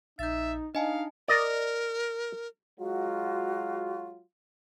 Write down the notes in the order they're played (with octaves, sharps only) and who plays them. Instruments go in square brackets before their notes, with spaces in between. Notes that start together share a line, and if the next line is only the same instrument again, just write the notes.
[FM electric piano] A#1 [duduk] D#4 [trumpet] E5 [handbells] G6 A6
[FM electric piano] D4 [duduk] D#4 [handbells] D#5 G#5 A5 [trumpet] F5
[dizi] A#4 [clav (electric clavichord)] D5 D#5
[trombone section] F#3 G#3 F4 [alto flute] F#4